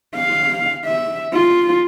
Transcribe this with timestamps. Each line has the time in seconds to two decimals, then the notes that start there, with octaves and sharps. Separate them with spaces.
0.15 F5
0.85 E5
1.33 F4